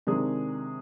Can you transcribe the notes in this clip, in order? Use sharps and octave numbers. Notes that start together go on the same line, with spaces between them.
C3 D#3 G#3 D4 G#4